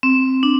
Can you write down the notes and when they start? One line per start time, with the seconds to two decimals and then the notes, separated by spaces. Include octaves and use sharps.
0.03 C4
0.43 D4